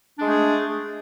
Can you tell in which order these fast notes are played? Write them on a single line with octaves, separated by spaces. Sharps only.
D4 G#3 G#4 A3